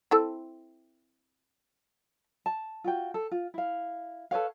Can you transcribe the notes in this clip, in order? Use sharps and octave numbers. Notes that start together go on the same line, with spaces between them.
C4 E4 A4
A5
F4 F#4 G5
A4
F4
E4 F5
A4 B4 C#5 F5